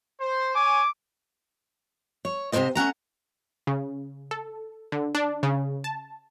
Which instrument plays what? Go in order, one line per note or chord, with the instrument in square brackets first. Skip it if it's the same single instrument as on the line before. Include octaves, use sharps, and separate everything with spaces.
[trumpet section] C5
[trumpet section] C#5 G#5 [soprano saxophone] D6
[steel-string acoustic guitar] C#5
G#2 C3 E3 F#3 C5 D#5
A3 C#4 F#5 A#5
[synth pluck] C#3
A4
D3
D4
C#3
A5